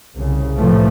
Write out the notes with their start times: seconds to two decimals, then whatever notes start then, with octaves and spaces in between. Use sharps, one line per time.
0.17 C2 C#3
0.57 A2 C3 E3 F3 A3